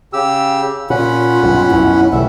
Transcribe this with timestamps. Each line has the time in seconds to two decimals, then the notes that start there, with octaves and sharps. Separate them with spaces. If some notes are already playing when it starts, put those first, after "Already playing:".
0.13 C#3 G4 E6
0.90 A#2 C#4 F4 F#5 B5
1.43 B1 G2
1.71 B1 F#2 E4
2.12 B1 C#3 E3 G3 A3 E5